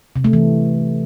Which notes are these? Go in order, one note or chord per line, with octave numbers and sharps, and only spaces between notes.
C3
A3
E3